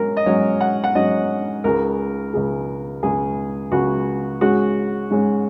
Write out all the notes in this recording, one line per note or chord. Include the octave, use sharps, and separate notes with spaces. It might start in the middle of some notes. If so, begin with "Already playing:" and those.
Already playing: G#2 F#3 C#4 A#4
D#5
G#2 F#3 C#4 C#5
F#5
F#5
G#2 F#3 C#4 D#5
C#2 C#3 G#3 A#4
C#2 C#3 G#3
C#2 C#3 G#3 G#4
C#2 C#3 G#3 F#4
G#2 G#3 C#4 F#4
G#2 G#3 C#4